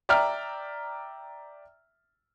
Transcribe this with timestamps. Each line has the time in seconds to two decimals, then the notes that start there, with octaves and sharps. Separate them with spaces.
0.09 D5 E5 G5 A#5 F6